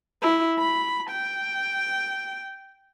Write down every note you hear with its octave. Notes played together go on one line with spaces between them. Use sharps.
E4
B5
G5